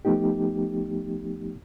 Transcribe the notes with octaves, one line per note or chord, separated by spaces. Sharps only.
F3 A3 B3 D#4 G4